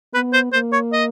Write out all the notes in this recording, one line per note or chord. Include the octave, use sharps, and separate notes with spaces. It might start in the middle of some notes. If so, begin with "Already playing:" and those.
B3 B4
C5
A#3 C5
C#5
D#5